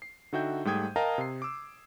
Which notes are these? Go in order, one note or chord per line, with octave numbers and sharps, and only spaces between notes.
C7
D3 D#4 F#4 E5 G5 G6
G#2 G3 A3 G5 D#6 G#6
A#4 D#5 F5 G5 A5 A#5
C3 C7
D6 E6